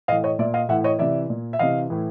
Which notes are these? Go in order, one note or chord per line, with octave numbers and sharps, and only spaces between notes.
A2 E3 D#5 F5
C#5 D#5
A#2 D5 E5
D#5 F5
A2 E3 E5 F#5
C#5 D#5
C3 E3 D5 E5
A#2
E5
C3 E3 D#5 F5
A2 E3